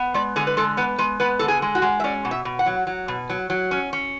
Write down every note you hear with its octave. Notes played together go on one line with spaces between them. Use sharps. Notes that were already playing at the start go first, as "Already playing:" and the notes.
Already playing: B3
G#3 D5
D3 G#4
B4
G#3 A4
B3 B4
G#3 B4
B3 B4
D3 A4
G#4
G#3
F#4
G#3
E5
C#4 D5
B2
E5
B2
F#5
F#3
F#3
B2
F#3
F#3
C#4
C#4